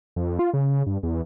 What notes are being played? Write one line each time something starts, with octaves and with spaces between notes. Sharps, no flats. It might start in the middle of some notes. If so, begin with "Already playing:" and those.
F2
F4
C#3
G2
E2